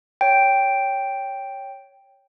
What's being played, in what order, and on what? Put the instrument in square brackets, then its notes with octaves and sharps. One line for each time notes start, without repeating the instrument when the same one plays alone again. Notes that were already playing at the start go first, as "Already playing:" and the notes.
[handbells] C#5 G5